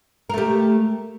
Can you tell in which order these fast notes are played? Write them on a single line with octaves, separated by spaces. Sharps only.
A#4 A3 G4